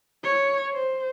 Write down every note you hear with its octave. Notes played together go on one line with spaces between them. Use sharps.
C#5
C5